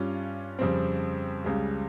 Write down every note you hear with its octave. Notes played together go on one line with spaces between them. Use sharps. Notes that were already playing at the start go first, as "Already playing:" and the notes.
Already playing: G2 G3 C#4 F4
F2 C#3 G3 C4
C#2 C#3 G3